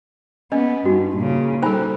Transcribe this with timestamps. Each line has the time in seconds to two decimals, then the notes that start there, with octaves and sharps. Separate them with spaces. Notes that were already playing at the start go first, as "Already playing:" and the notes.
0.52 B3 C#4 D#5
0.85 G2 D#4 F#4
1.16 A#2 C#3
1.63 G3 D#4 A4 C5 G#5 B5